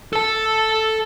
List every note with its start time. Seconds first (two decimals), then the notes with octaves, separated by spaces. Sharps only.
0.13 A4 A5